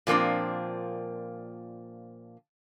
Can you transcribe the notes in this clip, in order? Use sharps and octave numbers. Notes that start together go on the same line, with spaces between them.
A#2 F3 A#3 C4 D4